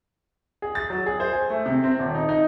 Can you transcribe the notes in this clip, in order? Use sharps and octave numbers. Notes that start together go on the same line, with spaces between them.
G#4
A6
F#3
G#4
C5
G#5
A3
C3
C4
D#1
D#4
D#4